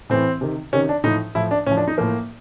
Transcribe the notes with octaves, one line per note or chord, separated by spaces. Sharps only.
A2 E3 C4
C3 D#3
C3 D#3 C#4
D4
A2 F3 D#4
A2 F3 E4
D4
A2 F3 C#4
D4
D#4
A2 F3 A#3